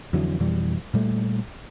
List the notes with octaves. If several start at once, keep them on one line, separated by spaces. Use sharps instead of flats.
F2 D3 E3 F#3
F2 B2 E3 G3
A#2 G3 A3